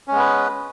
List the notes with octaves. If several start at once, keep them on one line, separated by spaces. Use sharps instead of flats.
G#3 B3 C#4 B4